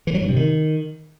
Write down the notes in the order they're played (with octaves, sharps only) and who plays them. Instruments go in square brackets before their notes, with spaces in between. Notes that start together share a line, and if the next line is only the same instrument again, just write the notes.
[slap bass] E3
F#3
G2
C3
D#3